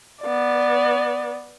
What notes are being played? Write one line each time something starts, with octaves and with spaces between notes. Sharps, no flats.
B3 D5